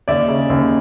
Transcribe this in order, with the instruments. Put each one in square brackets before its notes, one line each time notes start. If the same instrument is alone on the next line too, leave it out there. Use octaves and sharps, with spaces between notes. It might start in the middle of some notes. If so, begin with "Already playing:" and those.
[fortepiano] D#2 D5 E5
C#3
D#2